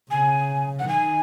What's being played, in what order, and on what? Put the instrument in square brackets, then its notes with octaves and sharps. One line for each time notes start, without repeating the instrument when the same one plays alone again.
[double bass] C#3 [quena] G#5
[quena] F#5
[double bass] D#3 [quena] G#5